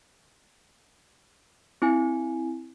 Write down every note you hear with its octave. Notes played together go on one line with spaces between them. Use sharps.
C4 E4 G#5